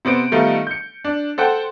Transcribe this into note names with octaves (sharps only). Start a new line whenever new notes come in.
C3 B3 C5 D7
D#3 G3 A3 B3 D#4 F4
G6 C#7
D4
A4 C5 F#5 G5